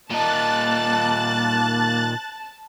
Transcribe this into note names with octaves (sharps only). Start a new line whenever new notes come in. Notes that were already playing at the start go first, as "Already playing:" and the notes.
A#2 A#3 D#4 A5 F#6 A6